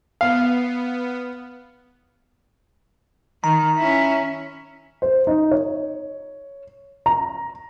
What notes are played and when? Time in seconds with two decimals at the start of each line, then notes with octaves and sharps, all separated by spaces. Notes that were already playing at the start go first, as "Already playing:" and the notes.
0.21 B3 F5
3.44 D#3 A#5
3.78 C#4 E4
5.02 C5
5.27 D#4
5.51 C#5
7.06 A#5